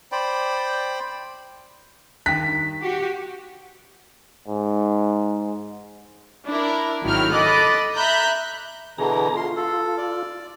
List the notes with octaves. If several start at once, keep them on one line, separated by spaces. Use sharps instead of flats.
C5 D5 G5 B5
G2 D#3 G5 F#6 B6
F#4 G4
G#2
D4 E4 A#4
G#1 D#3 F#3 E4 G5 F6
A4 D#5 B5 D6 F#6 A6
E5 A#5 B5 F#6 G6
B2 D3 E3 G#4 A#5
F4 C6
A4
D5